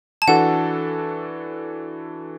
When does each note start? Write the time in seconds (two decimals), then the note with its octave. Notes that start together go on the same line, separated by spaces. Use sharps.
0.22 A5
0.28 E3 D4 F#4 A4 F#5